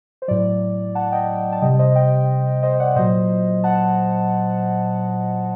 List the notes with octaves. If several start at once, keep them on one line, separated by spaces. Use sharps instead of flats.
C5
A2 F#3 D5
F#5 A5
D#5 G5
A5
C3 G3 D#5 G5
C5 D#5
D#5 G5
C5 D#5
D5 F#5
A#2 F#3 C5 D#5
F#5 A5